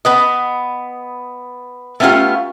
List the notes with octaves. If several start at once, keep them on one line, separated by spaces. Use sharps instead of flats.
B3 B4 D#5
A3 B3 C#4 E4 F4 G4